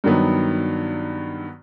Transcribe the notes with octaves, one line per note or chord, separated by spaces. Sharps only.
G2 D#3 F#3 B3